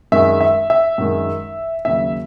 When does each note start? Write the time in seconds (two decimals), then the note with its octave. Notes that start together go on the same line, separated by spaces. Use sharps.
0.12 F#2 D#3 G#3 E5
0.41 E5
0.70 E5
0.98 F#2 D#3 G#3
1.85 D#2 C#3 F#3 E5